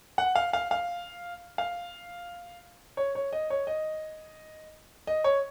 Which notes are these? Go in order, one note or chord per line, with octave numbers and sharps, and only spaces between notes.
F#5
F5
F5
F5
F5
C#5
C#5
D#5
C#5
D#5
D#5
C#5